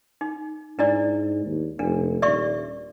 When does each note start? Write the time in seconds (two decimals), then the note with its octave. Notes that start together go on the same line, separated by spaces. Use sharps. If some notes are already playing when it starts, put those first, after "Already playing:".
0.21 D#4
0.79 G#2 D4 E4 D5
1.46 D#2
1.79 F1 D4
2.22 D#1 D5 E5 C#6